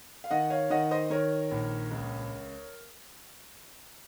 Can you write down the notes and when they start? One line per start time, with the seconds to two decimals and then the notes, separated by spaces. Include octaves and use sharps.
0.24 F5
0.31 D#3 D#5 F#5
0.50 C#5 F5
0.70 D#3 D#5 F#5
0.91 C5 D#5
1.10 D#3 A#4 C#5
1.51 A#1
1.91 C#2